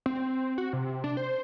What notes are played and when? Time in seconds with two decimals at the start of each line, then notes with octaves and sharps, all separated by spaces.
0.06 C4
0.58 F#4
0.73 C3
1.04 D4
1.17 C5